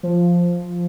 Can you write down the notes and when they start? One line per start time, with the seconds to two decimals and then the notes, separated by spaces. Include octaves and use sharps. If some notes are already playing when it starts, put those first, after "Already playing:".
0.03 F3